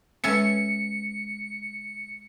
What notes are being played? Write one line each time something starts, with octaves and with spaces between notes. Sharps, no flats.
G#3 C#4 A4 B4 E5 C#7